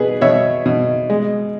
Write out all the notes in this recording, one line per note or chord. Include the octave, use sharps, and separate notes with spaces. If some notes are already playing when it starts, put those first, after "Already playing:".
Already playing: B2 G#4 B4
B2 C#5 E5
B2
G#3